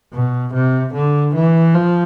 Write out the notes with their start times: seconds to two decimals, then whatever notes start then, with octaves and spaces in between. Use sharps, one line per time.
0.13 B2
0.53 C3
0.94 D3
1.35 E3
1.74 F3